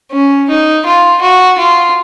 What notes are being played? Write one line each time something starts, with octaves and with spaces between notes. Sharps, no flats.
C#4
D#4
F4
F#4
F4